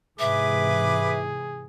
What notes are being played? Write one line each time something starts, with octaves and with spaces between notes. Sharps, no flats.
G#2 C3 E3 G#4 B4 E5 D6